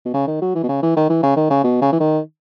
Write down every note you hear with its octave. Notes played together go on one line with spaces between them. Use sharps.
B2
C#3
D#3
F#3
E3
B2
C#3
E3
D#3
E3
C#3
D#3
C#3
B2
C#3
E3
D#3